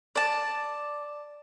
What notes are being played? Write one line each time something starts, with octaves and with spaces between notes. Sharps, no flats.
D5 A5